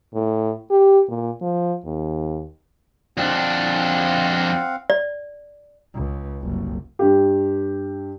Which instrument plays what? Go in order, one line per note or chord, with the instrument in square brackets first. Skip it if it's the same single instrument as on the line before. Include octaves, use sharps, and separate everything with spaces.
[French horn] A2
G4
A#2
F3
D#2
[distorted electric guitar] F2 D4 [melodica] C4 F5 F#5
[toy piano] D5
[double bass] C#2
F#1 C2
[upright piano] G2 G4